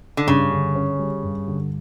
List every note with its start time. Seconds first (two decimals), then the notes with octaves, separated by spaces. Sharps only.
0.17 D3
0.27 G2 C#3
0.51 D3
0.75 C#4
0.99 G3
1.23 G2
1.48 D3